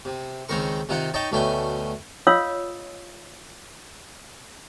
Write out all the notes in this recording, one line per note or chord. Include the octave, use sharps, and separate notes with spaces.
C3
C#2 D#3 C4 A#4 C#6
C3 D#3 D#4 F4 F#5
D#4 C#5 D#5 G5 A5
D2 B2 A3 C#4 G5 G#5
F4 C#5 D#5 F5 D#6 E6